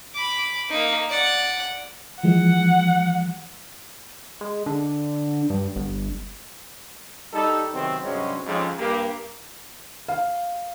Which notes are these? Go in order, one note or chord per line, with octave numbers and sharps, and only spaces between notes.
B5 D6
A#3 D#4
D5 F#5
E3 F3 G#3 F#5
G#3
D3
G2
G1
G3 D#4 A4
C3 D#3 F#3 B3 C4
G2 C3 F#3 G#3 C4 C#4
F2 G#2 C#3
G2 A#3 G4
F5